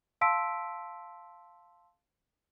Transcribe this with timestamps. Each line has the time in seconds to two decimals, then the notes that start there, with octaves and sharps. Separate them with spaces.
0.21 F5 A5 C6 E6 B6 D7